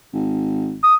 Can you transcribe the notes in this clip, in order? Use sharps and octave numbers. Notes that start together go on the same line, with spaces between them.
G#1
D#6